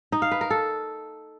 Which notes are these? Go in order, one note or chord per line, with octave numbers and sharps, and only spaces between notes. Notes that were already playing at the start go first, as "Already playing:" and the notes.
D#4
F5
B4
A#4
A4